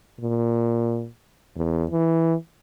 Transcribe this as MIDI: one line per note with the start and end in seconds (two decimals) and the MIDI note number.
0.20 1.07 46
1.56 1.85 40
1.91 2.34 52